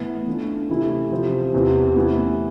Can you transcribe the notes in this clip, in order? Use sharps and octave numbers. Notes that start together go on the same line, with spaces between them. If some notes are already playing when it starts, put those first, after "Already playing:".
Already playing: A2 E3 B3 E4
E3 A3 D4 F4
C3 E3 A3 E4
C3 F3 C4
E2 C3 E3
A2 E3 B3 E4